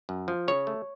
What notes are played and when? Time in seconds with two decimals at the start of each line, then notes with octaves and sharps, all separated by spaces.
0.09 F#2
0.28 F3
0.48 C#3 C#5
0.67 A3